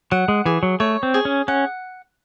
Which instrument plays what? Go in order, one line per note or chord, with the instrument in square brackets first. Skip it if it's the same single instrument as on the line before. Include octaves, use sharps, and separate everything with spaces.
[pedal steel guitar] F#3 [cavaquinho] F#5
[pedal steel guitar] G#3
[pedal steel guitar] E3 [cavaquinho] G#4
[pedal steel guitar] F#3
[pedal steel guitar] A3 [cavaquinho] C#5
[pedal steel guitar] C4
[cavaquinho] G#4
[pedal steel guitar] C#4
[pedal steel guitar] C#4 [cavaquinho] F#5